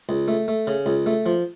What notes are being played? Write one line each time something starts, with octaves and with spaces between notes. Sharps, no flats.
C#2
A3
A3
C#3
C#2
A3
F3